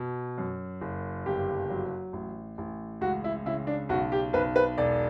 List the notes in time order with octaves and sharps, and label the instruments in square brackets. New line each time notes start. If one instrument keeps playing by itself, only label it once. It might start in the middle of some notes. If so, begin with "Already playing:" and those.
Already playing: [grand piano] B2
F#2
F#1
G1 G4
F#3
A1
A1
C#2 F#4
E4
C#3 E4
D4
B1 F#4
G4
B1 B4
B4
E1 D5